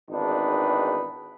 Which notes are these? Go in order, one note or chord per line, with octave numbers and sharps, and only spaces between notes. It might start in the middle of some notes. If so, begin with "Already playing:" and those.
G#1 E2 D4 D#4 B4